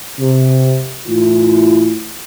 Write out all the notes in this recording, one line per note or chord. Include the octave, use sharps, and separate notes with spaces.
C3
A2 E3 E4 F4